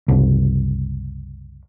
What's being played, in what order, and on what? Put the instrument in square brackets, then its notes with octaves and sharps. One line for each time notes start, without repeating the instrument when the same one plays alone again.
[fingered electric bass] F#1 C2